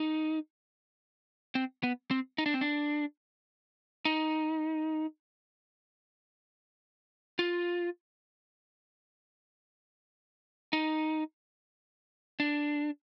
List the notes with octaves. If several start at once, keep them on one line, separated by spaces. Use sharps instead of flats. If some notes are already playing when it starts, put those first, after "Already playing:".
Already playing: D#4
C4
B3
C4
D#4
D4
C4
D4
D#4
F4
D#4
D4